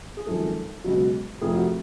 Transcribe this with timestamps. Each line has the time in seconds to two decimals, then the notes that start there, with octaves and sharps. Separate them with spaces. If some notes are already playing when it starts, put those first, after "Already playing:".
0.17 G#4
0.27 G#1 F#2 F3 A4
0.84 C#2 B2 F#3
1.41 F1 F2 F3 G#4
1.55 F#4